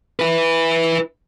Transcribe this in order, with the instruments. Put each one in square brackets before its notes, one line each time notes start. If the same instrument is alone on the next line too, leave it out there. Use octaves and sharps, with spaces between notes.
[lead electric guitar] E4 B4